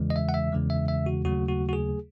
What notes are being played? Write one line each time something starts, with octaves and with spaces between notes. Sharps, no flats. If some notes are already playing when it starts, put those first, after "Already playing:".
Already playing: E2 C#3 E3 G#3
D#5
E5
F#5
E5
E2 C#3 E3 G#3
E5
E5
F#4
D#2 C#3 F#3 A3 F#4
F#4
F#4
G#4